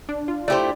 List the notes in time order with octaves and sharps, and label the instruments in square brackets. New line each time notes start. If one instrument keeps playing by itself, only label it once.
[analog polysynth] D4
F4
[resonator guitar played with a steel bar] A3 E4 G4 C5 [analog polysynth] D5